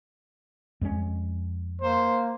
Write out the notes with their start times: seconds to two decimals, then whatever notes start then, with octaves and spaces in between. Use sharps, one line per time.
0.81 F2 G#3 C#4
1.81 A#3 C5